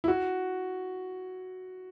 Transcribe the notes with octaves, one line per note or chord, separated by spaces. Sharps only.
E4
F#4